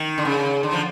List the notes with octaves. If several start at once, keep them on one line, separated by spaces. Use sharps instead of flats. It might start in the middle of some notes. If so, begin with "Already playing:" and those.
Already playing: D#3
D3
C#3
D3
F3